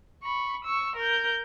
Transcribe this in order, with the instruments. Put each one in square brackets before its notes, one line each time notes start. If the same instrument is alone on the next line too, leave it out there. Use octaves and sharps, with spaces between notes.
[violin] B5 C#6
C#6 E6
A#4 G6